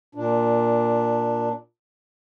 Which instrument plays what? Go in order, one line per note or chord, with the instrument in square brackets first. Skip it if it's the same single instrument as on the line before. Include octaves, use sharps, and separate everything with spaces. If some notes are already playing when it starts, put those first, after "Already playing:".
[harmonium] A#2 D4